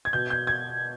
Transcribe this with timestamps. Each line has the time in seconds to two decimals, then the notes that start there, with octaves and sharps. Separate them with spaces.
0.05 G#6
0.13 B2 G6
0.30 G6
0.47 G#6